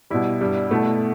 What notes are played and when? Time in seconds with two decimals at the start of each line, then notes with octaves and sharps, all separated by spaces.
0.10 B2 G3 E4
0.41 G2 G3
0.71 B2 A3 E4